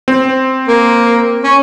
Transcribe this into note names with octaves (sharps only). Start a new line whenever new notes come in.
C4
A#3
C#4